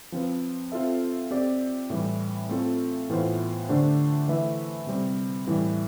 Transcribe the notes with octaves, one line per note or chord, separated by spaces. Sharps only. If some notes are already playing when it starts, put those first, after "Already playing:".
F3 C4 F4 B4
C4 F4 A4 E5
C4 G4 D5
A2 E3 G3
A3 C4 F4 A4
A2 E3 B3 F4 C5
D3 A3 D4 G4 C5
E3 A3 E4 B4 E5
C3 G3 C4
A2 E3 G3